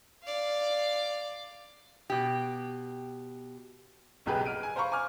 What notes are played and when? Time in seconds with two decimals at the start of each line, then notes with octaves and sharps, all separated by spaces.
0.23 D5 F5
2.10 B2 G4
4.26 F#1 B1 F#2 G4 G#4 B4
4.45 F6 D7 D#7
4.63 G#5
4.76 C5 F5 A#5 B5 C#6
4.92 G#5 D6 F6